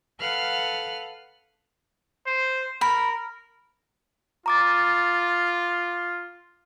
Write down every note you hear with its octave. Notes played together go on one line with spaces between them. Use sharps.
A4 B4 F5 F#5 F6 F#6
C5
A#4 B5
F4 A#5 D6 A6